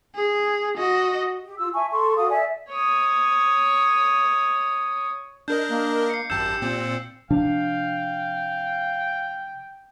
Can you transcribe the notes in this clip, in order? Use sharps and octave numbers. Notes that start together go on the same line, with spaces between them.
G#4
F#4 D#5
G4
F4 E6
E5 G#5 A5 C#6
A4 C6 C#6
F#4 A4 F5 D#6
D5 E5 G#5
C#5 D#6
D4 A#4 D#5 G6
A#3
C7 C#7
G#1 F#2 G4 A5 E6 G6 E7
A#2 C4
C3 F3 D4 F5 G5